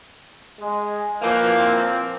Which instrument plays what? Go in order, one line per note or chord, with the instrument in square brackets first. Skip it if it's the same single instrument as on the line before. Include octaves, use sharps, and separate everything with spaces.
[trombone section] G#3
[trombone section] E3 [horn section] F3 A#3
[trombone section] A#2 C4